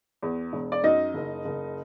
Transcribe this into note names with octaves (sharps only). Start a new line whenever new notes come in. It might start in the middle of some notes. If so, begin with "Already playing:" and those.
E2
E1
D5
F#2 D#4 D#5
F#1
F#1